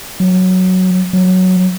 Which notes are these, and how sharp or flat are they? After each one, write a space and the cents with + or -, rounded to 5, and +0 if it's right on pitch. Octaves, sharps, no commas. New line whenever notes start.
F#3 +0
F#3 +0